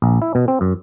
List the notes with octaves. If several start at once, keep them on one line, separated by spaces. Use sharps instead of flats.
A#1
E4
B2
C4
F#2